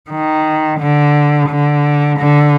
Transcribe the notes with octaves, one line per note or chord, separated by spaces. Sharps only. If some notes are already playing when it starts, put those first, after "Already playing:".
D#3
D3
D3
D3